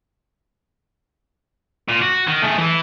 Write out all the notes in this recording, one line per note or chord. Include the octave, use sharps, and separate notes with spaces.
A#2
F#4
D#3
A3 G#4
E3 E4